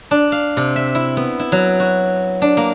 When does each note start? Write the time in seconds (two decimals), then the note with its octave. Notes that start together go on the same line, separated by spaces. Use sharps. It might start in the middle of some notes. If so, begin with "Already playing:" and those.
0.11 D4
0.32 F5
0.57 C3
0.76 E5
0.95 E4
1.17 B3
1.40 E4
1.52 F#3
1.80 F#4
2.42 D4
2.57 A#3